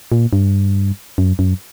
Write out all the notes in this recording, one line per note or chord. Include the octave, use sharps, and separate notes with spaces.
A#2
G2
F#2
F#2